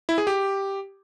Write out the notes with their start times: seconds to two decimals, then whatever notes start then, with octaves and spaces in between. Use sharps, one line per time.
0.09 E4
0.18 G#4
0.27 G4